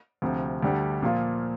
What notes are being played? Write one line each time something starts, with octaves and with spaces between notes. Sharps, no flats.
D2 C3 F3
D2 D3 G3 D4 G4
A#2 F3 A#3 F4